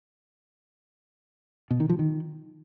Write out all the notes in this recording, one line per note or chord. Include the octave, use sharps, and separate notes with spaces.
B2
D#3
F3
D#3